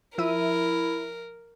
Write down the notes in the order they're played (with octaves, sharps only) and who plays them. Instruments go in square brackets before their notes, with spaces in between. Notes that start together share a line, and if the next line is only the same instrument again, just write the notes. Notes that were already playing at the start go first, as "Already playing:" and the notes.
[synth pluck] F3 E5 D#7 [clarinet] E4 [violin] A#4